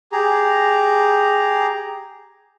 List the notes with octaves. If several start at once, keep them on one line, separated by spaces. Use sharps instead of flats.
G4 G#4 A#5